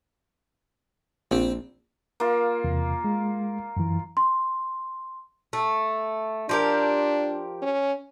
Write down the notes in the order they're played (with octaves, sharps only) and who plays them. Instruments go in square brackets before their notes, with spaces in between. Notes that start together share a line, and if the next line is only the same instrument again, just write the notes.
[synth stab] A#1 [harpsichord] C4
[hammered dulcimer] A#3 F4
[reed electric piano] E2 C3
G#3
F#2 E3
[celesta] C6
[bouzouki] A3
[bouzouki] F3 G4 A#4 [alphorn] D4
[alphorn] C#4